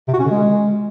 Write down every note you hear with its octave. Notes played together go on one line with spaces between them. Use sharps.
C3
F#4
C#4
D3
G#3